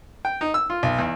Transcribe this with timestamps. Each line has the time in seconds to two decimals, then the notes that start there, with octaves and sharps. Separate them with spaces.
0.25 G5
0.41 D#4
0.54 E6
0.70 F4
0.83 B1
0.99 E2